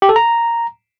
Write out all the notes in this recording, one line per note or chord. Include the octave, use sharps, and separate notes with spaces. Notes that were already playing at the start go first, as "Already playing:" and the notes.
G4
A4
A#5